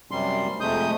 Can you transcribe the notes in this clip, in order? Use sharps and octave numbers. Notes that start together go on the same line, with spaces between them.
F#2 C3 G3 C6
F2 C3 G#3 A3 D#6 G6